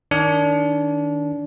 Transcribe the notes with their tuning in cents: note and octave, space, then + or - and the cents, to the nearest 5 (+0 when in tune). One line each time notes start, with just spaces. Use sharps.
D#3 +0 D4 -25